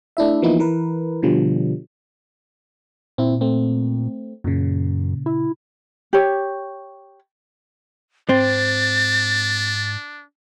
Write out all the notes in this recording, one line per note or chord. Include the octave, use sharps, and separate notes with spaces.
A3 D4 E4 E5
E3 F3 A#3 B3 D#4 E4
E3 A#4 B4
B2 D3 F3 G3
A#2 C4 E4
A3 C4
F#2 A#2 C#3
E4
G4 C#5
G#2 C4 D4 A6